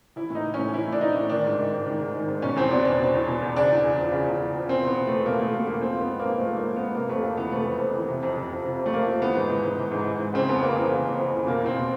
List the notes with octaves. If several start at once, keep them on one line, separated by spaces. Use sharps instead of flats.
E3 E4
A2 D#4
E3
C#4
A2
E3 E4
A2 D4
E3 D#4
A2
D#3 D4
G#2
D#3
G#2
D#3
G#2
D#3
G#2
B2 C#4
E2 C4
B2 D4
E2 D4
B2
E2
B2
E2
C#3 D4
E2
E2
F3
C#3
E2
E2
F3
B2 C4
E2 B3
B2
E2 A3
B2 A#3
E2 A3
B2 A3
E2 A#3
F3 C4
G#2 B3
F3
A#3
G#2
F3 A3
G#2 A#3
F3
G#2 B3
C3 A#3
F2 A3
F2 A#3
E3 B3
C3 A3
F2
F2
E3
C3
F2
F2
F3
C3
F2
A3
F2 A#3
F3
E3 B3
G#2
E3
G#2
E3
G#2
E3
G#2
C#3 C4
F2 B3
F2 A#3
E3 A#3
C#3
F2
F2
E3
B2 A#3
E2 C4
B2